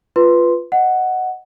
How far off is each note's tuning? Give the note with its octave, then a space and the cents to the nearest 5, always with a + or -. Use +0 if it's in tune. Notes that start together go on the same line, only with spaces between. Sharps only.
F4 +0 B4 +0 C6 +0
D#5 +0 F#5 +5